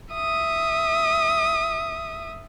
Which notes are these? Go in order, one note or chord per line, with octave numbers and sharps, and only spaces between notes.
E5 D#6